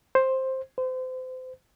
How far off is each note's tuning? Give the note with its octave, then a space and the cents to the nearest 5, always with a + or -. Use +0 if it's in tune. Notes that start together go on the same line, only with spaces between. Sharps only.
C5 +10
C5 -30